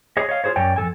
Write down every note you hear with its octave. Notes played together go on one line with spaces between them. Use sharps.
G#4 C#5 D#5
C#5 D#5 F5
F4 G4 G#4 C5 C#5
F#2 C#5 D5 G5 G#5
F2 C3 A4 G#5